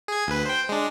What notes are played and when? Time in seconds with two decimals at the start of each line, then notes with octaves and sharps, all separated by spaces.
0.08 G#4 G#6
0.27 D2 B4
0.46 C5 G5
0.69 G#3 D4